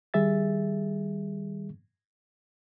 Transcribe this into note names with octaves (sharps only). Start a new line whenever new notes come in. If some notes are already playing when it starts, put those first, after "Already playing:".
D#3 G3 G#4 E5 A6